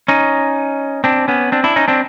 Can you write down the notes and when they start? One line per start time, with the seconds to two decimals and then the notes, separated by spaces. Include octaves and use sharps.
0.08 C#4 D#4
1.04 C4 D4
1.28 B3 C#4
1.52 C4 D4
1.64 D4 E4
1.76 C#4 D#4
1.88 C4 D4